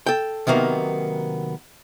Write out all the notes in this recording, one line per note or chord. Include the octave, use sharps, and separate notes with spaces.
A4 G5
C3 D#3 F#3 A#3 B3